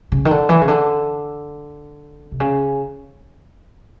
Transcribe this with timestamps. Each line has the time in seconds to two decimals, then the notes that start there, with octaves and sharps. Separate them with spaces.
0.12 C#3
0.25 D#3
0.31 D3
0.49 E3
0.61 C#3
0.68 D3
2.32 C3
2.40 C#3